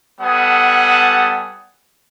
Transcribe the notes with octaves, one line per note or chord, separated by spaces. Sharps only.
G3 B3 A4 F#5 G#5 D#6